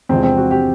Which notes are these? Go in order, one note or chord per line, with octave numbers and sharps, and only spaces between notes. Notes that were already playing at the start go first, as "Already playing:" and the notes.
E2 C3 F3 G#3 C4
C4
F#4
G4